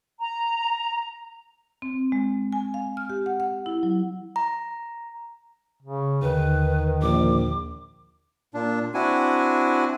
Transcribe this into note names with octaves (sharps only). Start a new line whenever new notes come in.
A#5
C4
G#3
G#5
F5
F6
G4
F#5
F#5
E4
F#3
A#5
C#3
D#2 D3 D#3 B4
A#1 D6
A#2 D4
C4 D4 E4 F#4 G#5